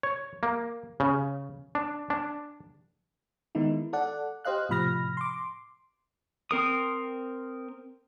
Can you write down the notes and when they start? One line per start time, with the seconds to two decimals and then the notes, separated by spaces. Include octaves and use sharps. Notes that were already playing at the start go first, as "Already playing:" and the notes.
0.03 C#5
0.43 A#3
1.00 C#3
1.75 D4
2.10 D4
3.55 D#3 G#3 B3 D#4 E4
3.93 A4 D5 F#5
4.45 G4 C5 D#5 F5 F#6
4.69 A2 C3 F3 B5 F6 A#6
5.17 C6 D6
6.51 C4 A#4 D#6